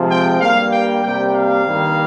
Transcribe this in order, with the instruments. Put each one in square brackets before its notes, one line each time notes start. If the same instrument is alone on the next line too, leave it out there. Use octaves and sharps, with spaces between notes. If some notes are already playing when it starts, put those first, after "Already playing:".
Already playing: [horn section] C3 F3 G#3
G5
G2 G3 A#3 F5
G5
C3 G3 A#3 G5
F5
G2 D#3 G3 A#3